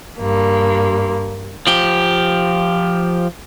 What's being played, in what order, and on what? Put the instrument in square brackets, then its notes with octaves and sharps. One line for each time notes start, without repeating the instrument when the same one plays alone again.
[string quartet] G2 A#3
[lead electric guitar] F3 G4